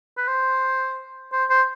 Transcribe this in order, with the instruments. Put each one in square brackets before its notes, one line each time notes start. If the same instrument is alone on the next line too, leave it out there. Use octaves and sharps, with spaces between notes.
[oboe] B4
C5
C5
C5